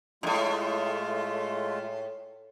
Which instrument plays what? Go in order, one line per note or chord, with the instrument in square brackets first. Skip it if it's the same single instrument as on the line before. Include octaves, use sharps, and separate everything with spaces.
[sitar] F#2 A2 [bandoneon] G#3 A3 F4